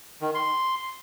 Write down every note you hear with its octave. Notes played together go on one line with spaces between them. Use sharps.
D#3
C6